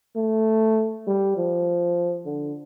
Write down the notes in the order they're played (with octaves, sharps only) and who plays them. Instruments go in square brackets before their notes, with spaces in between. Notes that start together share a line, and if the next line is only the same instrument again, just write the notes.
[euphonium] A3
G3
F3
D3